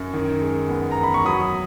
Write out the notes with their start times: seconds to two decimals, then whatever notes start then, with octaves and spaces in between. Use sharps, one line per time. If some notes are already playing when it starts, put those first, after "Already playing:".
Already playing: F#2
0.14 D#3
0.41 G#3
0.69 B3
0.92 A#5
0.98 E2
1.04 B5
1.14 C#6
1.25 F#3 B5 D#6